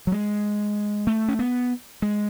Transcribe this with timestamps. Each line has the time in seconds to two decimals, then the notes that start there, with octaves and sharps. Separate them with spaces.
0.07 F#3
0.12 G#3
1.07 A3
1.28 C#4
1.39 B3
2.02 G#3